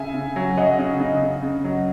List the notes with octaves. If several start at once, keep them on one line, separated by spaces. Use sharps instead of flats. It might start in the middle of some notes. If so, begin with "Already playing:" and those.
Already playing: C#3 E5 G#5
C#3
F#3
F#3 D#5 F#5
C#3
C#3
C#3
C#3
F#3